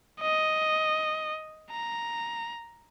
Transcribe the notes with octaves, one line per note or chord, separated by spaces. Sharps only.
D#5
A#5